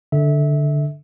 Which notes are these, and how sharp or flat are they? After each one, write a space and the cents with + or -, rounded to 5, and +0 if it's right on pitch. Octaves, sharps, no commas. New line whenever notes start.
D3 +0 E5 -25